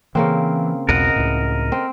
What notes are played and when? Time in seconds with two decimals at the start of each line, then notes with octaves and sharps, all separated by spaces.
0.15 C#3 E3 A#3 C4
0.89 B1 E2 B2 A#4 D#5 F#5
1.16 C#2 A2
1.72 C4